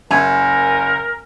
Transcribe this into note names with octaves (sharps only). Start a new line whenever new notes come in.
F#1 A#4 E5 G#5